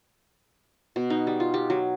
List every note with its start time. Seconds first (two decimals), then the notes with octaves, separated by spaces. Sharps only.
0.96 B2
1.10 D#4
1.27 G3
1.40 F4
1.54 G4
1.70 F#3